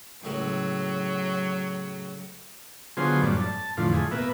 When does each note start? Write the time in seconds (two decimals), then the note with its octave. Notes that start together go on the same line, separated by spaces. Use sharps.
0.24 C#2 A2 F#3 E4
2.97 D3 F#3 B3 F4 G#4 C5
3.22 F#2 A2 G3 D5
3.41 A5
3.77 F2 A2 D3 E3 F4
3.93 A3 G#4
4.11 B2 A#3 B4 E5